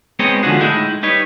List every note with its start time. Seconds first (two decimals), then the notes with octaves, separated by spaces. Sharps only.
0.19 G#3 B3 C4 D#4 C#5 D#5
0.43 D3 F3 G#3 D4 F#4 G#4
0.60 A2 G#3 D#4 E4
1.03 G3 D#4 B4 C#5